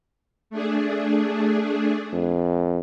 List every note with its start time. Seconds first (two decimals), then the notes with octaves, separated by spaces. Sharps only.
0.50 A3 D4 G#4
2.13 F2